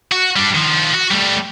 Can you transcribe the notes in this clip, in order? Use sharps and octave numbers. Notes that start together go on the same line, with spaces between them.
F#4
G3 D4
D#3 F3
F#4
G3 A3